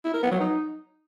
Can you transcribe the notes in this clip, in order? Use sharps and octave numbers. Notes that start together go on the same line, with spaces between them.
E4
A#4
B3
F#3
D#4